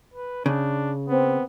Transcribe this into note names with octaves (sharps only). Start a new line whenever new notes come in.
B4
C#3 D4
B3 C4